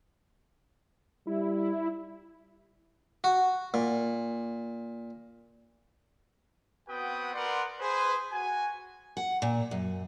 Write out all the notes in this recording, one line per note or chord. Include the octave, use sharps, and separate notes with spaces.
G3 E4
F#4
A#2
B3 C4 F#4 B4 G5 D#6
A#4 B4 D5 F#5 C6
G#4 B4 C5
F#4 G#5
F#5
A#2
F#2